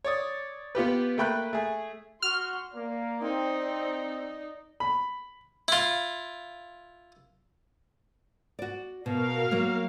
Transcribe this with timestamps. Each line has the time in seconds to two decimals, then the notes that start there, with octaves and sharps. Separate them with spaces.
0.05 C#5 D5 D#6
0.75 B3 F4 G4 B4
1.18 A3 A#3 G5 B5 F#6
1.53 A3 G#4
2.22 F#4 C6 F6
2.75 A#3 D5
3.22 C4 D#4
4.80 B5
5.68 E4 F4
8.59 F#4 D5
9.06 B2 F#4 A#4 F5
9.51 F#3 A#3